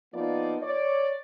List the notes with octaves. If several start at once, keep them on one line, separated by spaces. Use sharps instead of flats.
F3 A#3 B3 D#4 F4 D5
C#5 D5